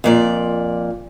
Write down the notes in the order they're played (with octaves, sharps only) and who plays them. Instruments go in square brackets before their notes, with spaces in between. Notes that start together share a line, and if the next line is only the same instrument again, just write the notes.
[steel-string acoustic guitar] F2 A#2 D5